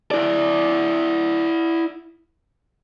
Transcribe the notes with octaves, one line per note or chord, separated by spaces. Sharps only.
E4 D5